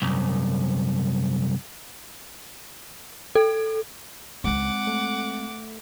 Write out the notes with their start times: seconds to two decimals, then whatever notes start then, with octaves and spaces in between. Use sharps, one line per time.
0.02 C2 F#2
3.35 A4
4.44 C#2 G#3 C4 F#5 D6
4.87 A3